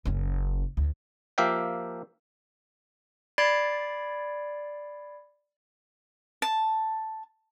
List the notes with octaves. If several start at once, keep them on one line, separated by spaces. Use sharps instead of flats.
F#1 C#4
D2
F3 A#3 G4 E5 F5 G5
D5 B5 G#6 A6 C7 D7
A5